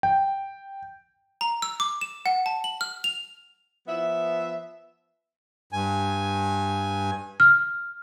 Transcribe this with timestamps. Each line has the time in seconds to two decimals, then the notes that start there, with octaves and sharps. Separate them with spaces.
0.03 G5
1.41 A#5
1.62 E6
1.80 D6
2.01 E7
2.26 F#5
2.46 A5
2.64 F#7
2.81 F6
3.04 F7
3.87 F3 B3 E5
5.73 G2 G#5
7.40 F6